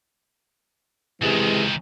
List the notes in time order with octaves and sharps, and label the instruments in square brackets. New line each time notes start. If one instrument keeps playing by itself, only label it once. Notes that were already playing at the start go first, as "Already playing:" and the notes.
[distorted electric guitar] C#2 D#3 [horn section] C3 E3 G#3